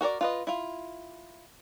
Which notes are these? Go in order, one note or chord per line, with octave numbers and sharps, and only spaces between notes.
F#4 A#4 C#5 D5
F4 B4 D#5
E4 F4